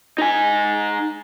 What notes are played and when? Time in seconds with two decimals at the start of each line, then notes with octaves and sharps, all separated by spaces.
0.18 D#4 G#5